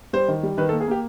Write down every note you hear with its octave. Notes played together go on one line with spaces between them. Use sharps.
G3 C5
D#3
G3
D#3 B4
A4
A#3
G#4
A#3 G4